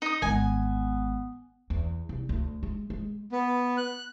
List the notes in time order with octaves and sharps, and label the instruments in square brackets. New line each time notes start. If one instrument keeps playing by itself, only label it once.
[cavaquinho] D#4 D#6
[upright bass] G#1 G#3 [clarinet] B3 [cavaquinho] G#5
[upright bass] E2
C2
D2
G#3
G#3
[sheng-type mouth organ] B3
F#6